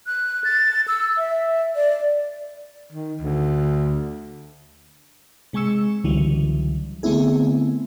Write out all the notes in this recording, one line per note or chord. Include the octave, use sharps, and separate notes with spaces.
F#6
A6
E6
E5
D5
D#3
D2
C3 G#3 G#5 C#6 E6 C#7
C#2 D3 E3 F#3 G3
D3 A3 B3 C4 E4 G#4